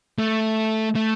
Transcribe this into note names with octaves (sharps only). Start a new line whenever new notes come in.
A3
A3